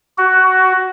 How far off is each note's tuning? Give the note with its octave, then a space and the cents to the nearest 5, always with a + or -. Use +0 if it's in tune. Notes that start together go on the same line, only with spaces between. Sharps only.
F#4 +15